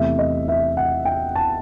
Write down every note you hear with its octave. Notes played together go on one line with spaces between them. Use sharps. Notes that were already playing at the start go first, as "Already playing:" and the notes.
Already playing: E2 C3 E3 A3 E5
D#5
E5
F#5
G5
A5